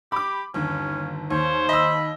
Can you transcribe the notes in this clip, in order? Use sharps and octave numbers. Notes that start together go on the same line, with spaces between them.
G4 B5 D6
G1 D#2 C#4
D#2 C5 C#5
D#5 B5 E6